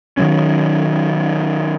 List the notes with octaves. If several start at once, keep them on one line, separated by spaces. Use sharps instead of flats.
D#3 E3 F#3 C#4